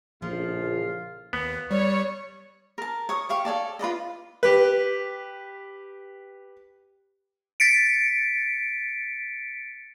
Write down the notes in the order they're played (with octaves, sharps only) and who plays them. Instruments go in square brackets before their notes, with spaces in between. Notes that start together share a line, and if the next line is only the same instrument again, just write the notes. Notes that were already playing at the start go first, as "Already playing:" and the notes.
[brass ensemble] A#1 A2 C#3 [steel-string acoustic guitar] F3 [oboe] F4
[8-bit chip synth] D#2 [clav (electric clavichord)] B3
[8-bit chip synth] G3 [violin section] C#5 [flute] D5
[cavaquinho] A#4 A5
C#5 C#6 D#6
G4 F5 C#6
A4 C#5 D5 A5
F4 B4 D5 D#5
[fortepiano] G4 B4
[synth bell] A6 B6 C#7 D7